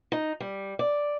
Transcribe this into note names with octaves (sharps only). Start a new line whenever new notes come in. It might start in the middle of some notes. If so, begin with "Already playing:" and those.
D#4
G3
D5